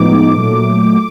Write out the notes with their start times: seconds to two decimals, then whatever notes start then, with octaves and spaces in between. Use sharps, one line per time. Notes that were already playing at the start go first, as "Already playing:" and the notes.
Already playing: A2 F3 G#3 B3 D#4 D6
0.35 A#2 F#3 A3